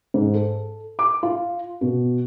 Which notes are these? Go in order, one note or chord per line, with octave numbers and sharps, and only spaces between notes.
G#2
A4
D6
F4
B2